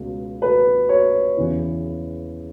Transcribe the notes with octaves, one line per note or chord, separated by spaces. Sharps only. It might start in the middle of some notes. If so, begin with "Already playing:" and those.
Already playing: C#2 B2
B4
C#5
E2 C#3 E3